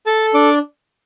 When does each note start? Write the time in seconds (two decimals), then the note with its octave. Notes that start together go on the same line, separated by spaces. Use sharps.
0.06 A4 A5
0.34 D4 D6